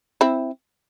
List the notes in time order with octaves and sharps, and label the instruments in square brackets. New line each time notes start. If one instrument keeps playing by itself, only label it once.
[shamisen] C4 E4